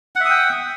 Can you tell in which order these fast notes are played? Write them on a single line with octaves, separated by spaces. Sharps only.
F#5 E5 D#6 G5